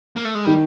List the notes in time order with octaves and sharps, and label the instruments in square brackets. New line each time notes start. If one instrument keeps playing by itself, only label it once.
[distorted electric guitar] A#3
A3
G#3
[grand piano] D#3 [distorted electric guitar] G3